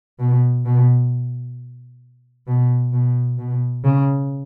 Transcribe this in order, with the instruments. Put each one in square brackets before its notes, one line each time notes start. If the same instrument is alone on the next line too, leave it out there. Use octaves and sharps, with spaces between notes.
[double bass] B2
B2
B2
B2
B2
C#3